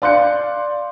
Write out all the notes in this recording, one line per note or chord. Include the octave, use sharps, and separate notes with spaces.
D5 F5 C6 F#6 G6 C#7